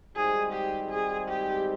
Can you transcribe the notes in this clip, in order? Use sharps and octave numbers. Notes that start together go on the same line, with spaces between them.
G#1 G#2 G3 C4 G#4
G4
G#4
G4